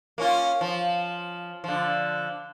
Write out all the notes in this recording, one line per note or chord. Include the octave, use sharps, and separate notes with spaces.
A#3 C#4 F4
F3
D3 F3